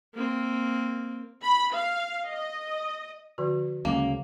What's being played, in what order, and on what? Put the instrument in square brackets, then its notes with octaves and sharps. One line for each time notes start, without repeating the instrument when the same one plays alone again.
[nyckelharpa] A#3 C4
[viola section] B5
F5
D#5
[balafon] D3 F3 F#4
[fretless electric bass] D2 F#3 G#3 [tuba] C#3 [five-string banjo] A#3